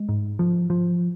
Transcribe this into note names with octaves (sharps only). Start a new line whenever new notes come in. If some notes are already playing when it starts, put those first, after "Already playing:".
Already playing: G#3
G#2
F3
F3